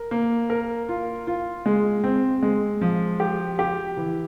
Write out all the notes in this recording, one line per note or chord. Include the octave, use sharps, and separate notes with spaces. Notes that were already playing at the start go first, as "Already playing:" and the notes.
Already playing: A#4
A#3
A#4
F4
F4
G#3
C4
G#3
F3
G4
G4
E3